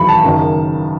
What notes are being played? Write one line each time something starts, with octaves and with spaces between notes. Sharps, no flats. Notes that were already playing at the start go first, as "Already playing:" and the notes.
Already playing: E1 E2 D#3 F#3 B5 C#6
A5
F#1 F#2 D#3